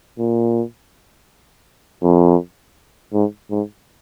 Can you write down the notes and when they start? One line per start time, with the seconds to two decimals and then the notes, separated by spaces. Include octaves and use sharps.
0.18 A#2
2.03 F2
3.13 G#2
3.50 G#2